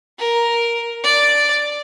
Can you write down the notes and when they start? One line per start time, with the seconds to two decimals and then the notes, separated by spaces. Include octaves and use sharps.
0.18 A#4
1.04 D5